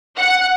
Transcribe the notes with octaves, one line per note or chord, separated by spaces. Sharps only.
F#5